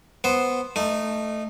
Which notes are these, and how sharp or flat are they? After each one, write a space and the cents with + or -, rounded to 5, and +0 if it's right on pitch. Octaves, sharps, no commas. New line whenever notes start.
B3 +0 C5 +0
A3 +0 D#4 -20